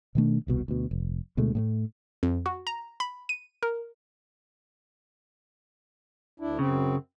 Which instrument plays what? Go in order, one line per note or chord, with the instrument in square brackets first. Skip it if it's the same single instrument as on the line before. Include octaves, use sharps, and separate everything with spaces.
[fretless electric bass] B2 D#3 A3 D4
D#1 C2 B2
D2 B2
F1
D2 B2 G#3 A3
A2 G#3 A3
[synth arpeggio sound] F2
F#4
A#5
B5
D#7
A#4
[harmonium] D2 D4 E4
[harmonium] F#2 C4 [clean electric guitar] C#3